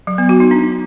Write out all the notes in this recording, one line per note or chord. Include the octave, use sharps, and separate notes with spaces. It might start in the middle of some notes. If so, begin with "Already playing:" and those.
F#3
B3
F#4
D#4
D4